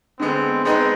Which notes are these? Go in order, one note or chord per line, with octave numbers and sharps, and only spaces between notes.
D3 G#3 B3 C4
G#3 B3 C4 D#4 B4 D#5